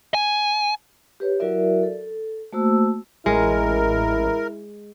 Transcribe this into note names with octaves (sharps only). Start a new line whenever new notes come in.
G#5
G4 B4 C#5
F#3 E4 F#4 A#4 D5 E5
A4
A3 A#3 F#4 C5 A5 E6
A1 G#3 E4 A#4